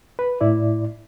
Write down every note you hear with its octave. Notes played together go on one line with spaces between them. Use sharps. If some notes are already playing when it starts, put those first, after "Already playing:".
B4
A2 E4 D5